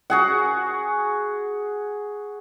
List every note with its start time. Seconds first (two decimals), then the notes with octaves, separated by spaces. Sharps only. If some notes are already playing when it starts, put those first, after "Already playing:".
0.10 F#4 G#4 F#5